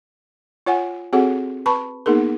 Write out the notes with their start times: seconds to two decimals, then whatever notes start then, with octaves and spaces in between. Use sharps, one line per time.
0.66 F4 C#5 F#5 G#5
1.13 C4 F#4 G#4 A4 C#5 F#5
1.66 B4 A5 B5 C#6
2.06 A#3 B3 D#4 G#4 A#4